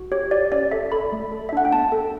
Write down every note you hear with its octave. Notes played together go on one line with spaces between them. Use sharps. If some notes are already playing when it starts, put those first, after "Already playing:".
Already playing: F#4
G4 C#5
G4 D5
C#4 D5
A4 E5
A4 B5
A3
A4
E5
D4 F#5
G5
B3 A5
A4